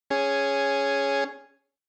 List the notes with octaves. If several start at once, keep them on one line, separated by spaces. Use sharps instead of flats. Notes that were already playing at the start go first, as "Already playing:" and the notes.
C#4 G#4